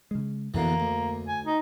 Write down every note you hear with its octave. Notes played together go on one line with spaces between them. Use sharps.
C#3 G#3
F2 B2 D3 E3 A#3
D2
G#5
D#4